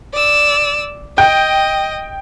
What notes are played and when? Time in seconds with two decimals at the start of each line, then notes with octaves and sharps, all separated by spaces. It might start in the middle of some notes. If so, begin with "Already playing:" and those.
0.13 D5 E6
1.18 D#5 G5